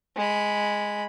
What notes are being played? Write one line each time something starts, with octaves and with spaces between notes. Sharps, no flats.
G#3 B5